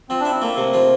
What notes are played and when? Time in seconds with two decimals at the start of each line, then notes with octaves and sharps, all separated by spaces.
0.09 F3 C4
0.20 D4 E4
0.31 C4
0.41 A3 A#3
0.57 C3
0.74 F3